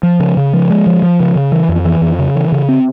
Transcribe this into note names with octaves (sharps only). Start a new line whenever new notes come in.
F3
C#3
C#3
F3
G#3
F3
F3
C#3
C#3
E3
F2
E3
F2
C#3
E3
C#3
C4